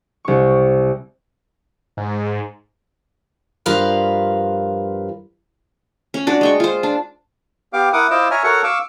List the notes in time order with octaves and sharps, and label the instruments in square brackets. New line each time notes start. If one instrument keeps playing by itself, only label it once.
[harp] C2 C#6
[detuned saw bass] G#2
[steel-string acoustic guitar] G2 F3 F4 A#4 B4 F5
[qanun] C#4
D4 F#4 D5
G#3 G5 C#6
F4 C5
D4
[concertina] B3 G4 F5 D6
E4 A#4 F#5 D6 D#6
E4 F4 C5 D#5 D6 E6
C#5 E5 G#5 A#5 F6
F#4 A4 A#4 C#5 F#5 C#6
F5 C#6 D6 E6